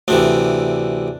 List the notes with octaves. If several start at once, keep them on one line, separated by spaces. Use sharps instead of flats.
D2 C3 E3 D4